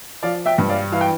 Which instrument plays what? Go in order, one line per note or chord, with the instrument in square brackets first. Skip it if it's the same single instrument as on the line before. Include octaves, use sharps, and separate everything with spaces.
[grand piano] F3 D5 F5
E5 G5
G2
D5 F5
E3 F5
G5